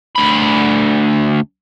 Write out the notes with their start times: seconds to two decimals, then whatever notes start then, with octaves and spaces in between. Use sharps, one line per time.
0.16 D2 B5